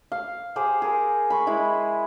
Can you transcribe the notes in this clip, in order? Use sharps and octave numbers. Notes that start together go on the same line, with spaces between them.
F5
G4 G#4 C5
G#4 A#4
B5 C#6
G#3 E4